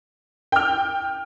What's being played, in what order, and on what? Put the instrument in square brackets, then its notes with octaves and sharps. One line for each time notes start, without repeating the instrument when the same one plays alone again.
[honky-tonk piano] G5 F6